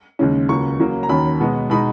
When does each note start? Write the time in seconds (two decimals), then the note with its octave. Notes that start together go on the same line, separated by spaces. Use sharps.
0.19 D#2 C#3 G#3 C#4
0.49 C#2 C#3 F#3 A#3 C#6
0.79 C#3 F#3 A#3 C#4
1.03 A#5
1.09 D#2 D#3 F#3 C#4 B5
1.40 B2 G#3 B3
1.70 B2 G#3 D#4 B5